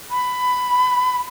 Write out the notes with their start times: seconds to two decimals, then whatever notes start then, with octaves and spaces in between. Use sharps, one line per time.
0.10 B5